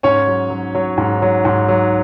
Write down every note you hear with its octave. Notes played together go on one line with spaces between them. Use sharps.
G#2 C#4 C#5
F#3
F#3
F#3
G#2
F#3
G#2
F#3